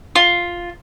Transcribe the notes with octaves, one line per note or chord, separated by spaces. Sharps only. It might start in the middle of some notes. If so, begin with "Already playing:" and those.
F4